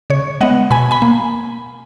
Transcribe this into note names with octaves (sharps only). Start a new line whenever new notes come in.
C#3 C#5
G#3 B3 D#5 F#5
B2 G#5 B5
G#5 B5
A#3